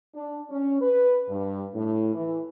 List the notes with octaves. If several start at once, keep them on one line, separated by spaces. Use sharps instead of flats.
D4
C#4
B4
G2
A2
E3